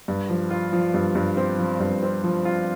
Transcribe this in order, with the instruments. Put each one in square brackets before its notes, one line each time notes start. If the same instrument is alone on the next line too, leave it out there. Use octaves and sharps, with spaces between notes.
[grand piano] G2
F3
F4
F3
G2
G2
C4
F3
G2
C4
F3
F4